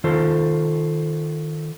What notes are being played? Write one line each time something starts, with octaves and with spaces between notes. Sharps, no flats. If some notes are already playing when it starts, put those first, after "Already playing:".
D#3 F4 A4 C5